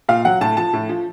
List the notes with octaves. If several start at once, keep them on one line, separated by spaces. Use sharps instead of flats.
A#2 F5
F#3 F#5
A2 A5
F3 A5
A2
F3